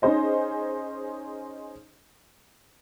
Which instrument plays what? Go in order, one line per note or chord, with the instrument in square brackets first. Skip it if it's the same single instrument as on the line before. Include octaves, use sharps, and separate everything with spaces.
[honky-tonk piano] C#4 D#4 G#4 C5 D#5